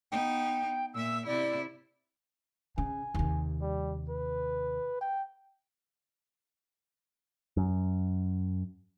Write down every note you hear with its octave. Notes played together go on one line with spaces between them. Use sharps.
B3 D#4 G5
A#2 E5 E6
C3 E4 D5
C#3 G#5
D#2 C3
G3
B4
G5
F#2